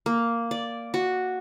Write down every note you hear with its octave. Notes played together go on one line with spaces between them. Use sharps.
A#3
D5
F#4